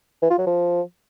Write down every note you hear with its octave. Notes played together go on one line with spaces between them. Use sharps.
E3
F4
F#3
F3